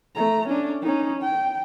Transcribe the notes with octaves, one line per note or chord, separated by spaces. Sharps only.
A3 A#5
C#4 D4
C#4 D#4
G5